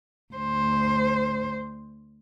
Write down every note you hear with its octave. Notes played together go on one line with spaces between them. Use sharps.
D2 C5